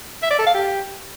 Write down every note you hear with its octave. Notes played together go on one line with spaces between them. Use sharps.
E5
D5
A4
F5
G4